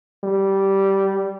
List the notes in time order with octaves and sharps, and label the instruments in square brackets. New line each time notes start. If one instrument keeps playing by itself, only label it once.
[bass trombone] G3